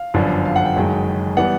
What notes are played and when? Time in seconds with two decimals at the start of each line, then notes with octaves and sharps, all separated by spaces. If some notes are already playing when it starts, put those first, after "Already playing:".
Already playing: F5
0.14 G1 F#2 D3 F3
0.45 F5
0.56 F#5
0.65 G5
0.76 F#1 F#2 D#3 G#3
1.37 E3 G3 B3 F#5